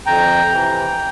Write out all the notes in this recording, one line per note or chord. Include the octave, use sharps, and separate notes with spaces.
F2 G5 A#5
C3 E3